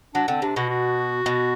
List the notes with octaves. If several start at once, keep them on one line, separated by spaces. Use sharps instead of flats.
F#3 D4
D3 C4
C3 D4
B2 F#4
F#4
B2